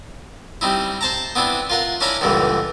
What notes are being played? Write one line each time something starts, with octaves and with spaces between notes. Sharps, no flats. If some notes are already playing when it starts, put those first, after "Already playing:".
G3 C4 D#4 E4
C5 A5 A#5
B3 C4 D4 E4
F4 A#4 F#5
C#4 D4 E4 C#5 A#5 B5
C#2 G2 A#2 D3 E3